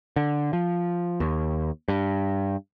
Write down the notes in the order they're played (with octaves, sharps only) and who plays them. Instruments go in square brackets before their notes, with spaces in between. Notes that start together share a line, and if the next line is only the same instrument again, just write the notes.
[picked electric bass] D3
F3
D#2
G2